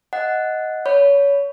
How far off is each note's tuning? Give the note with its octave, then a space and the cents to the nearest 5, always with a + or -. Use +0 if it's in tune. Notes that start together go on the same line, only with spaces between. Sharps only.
D#5 +10 F#5 +0
C#5 +25 B5 +0